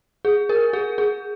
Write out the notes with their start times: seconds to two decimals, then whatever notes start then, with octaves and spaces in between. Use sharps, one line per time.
0.25 G#4
0.49 A#4
0.73 G#4
0.98 G#4